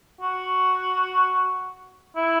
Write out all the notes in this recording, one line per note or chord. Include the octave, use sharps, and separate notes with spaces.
F#4
E4